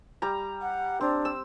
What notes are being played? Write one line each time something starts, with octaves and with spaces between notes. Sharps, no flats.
G3 A#5
F#5
C4 D4
E6